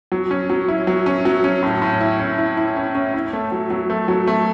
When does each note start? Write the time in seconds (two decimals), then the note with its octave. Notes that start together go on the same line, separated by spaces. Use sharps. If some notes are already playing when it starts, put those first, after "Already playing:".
0.12 F#3
0.31 C#4
0.50 F#3
0.68 E4
0.87 F#3
1.06 C#4
1.25 F#3
1.44 C#4
1.63 A2
1.82 A2
2.01 E4
2.19 C#4
2.38 E4
2.57 E4
2.77 C#4
2.95 C#4
3.14 E4
3.33 A3
3.52 F#3
3.70 F#3
3.90 A3
4.08 F#3
4.27 A3